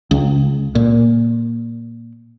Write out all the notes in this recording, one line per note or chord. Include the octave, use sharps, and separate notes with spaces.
C#2
A#2